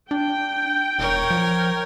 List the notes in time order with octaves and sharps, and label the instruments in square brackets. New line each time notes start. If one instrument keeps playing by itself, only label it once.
[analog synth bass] D4 [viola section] G5
[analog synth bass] E1 [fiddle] A#4 C#5
[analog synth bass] F3